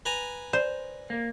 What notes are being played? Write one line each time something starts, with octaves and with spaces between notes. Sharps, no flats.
B4 G#5 A#5
C5 D5
A#3